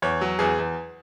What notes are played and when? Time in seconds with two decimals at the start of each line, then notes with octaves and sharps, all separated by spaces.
0.02 E2 C#5
0.21 F#3
0.39 E2 G#4
0.59 E2